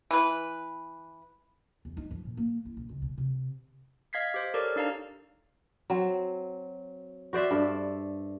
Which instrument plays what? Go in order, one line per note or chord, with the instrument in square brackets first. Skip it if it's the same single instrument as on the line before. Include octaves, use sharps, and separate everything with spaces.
[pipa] E3 B4
[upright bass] E2
D#4
F3
A#2
A#3
E4
A#1
C#2
B2
C3
[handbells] D#5 F5 G#6 B6 C7
G4 C5
G4 A4 A#4 C#5 D5
D4 D#4 D5 F5 A5 A#5
[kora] F#3 C4
F#4 C5 D5 E5
G2 A4